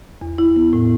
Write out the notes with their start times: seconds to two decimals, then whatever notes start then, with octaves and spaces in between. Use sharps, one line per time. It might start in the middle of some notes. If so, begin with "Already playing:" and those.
0.21 E2
0.38 E4
0.56 B3
0.73 A2